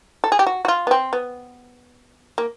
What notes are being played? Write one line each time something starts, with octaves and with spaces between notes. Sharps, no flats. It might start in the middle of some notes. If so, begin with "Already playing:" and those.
A4
G#4
G4
F#4
F#4
F4
B3
C4
B3
A#3